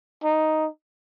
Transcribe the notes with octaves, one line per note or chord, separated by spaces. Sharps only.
D#4